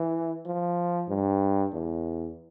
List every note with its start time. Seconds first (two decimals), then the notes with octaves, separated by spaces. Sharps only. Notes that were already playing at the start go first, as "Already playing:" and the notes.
Already playing: E3
0.46 F3
1.09 G2
1.73 E2